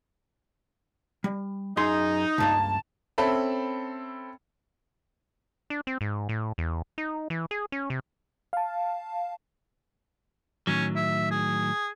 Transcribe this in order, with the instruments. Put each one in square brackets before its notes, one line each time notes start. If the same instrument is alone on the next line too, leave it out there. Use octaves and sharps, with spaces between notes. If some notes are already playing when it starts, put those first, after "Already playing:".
[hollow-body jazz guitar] G3
[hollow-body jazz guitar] F#2 G#4 C6 [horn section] D#4
[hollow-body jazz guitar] C#2 G2 A#3 [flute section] A5
[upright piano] C4 C#4 A4 E5 B5
[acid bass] D4
C4
G#2
A2
E2
D#4
E3
G#4
C#4
C3
[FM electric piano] F5 A5
[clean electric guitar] A2 D#3 F#3 [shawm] C#4
[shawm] E5
G#4